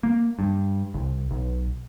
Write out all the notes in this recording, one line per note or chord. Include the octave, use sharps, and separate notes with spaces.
A#3
G2
C2
B1